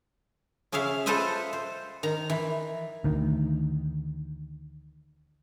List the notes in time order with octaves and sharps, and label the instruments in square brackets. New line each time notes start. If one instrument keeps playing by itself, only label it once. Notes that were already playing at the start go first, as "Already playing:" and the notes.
[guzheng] C#3 C#4 G#4 E5 F5
F4 A4 B4 C5 D#5 E5
C5
D#3 A#5
E3
[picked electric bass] D2 D#3